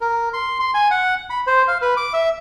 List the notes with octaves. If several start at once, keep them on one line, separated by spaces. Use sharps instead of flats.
A#4
C6
C6
G#5
F#5
B5
C5
F5
B4
D6
E5